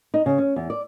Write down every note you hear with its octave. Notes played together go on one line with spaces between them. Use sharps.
D#4
C#3
C#4
E2
D5